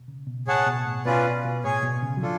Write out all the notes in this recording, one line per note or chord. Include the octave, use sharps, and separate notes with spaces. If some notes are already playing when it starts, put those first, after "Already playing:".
Already playing: B2
C#3
B2
A2 G#4 C#5 F#5 A5
B2
A2
B2 C#4 F4 B4 D5
B2
A2 G#4 C#5 G#5
B2
C#3
F#3
F3 D4 F4 A4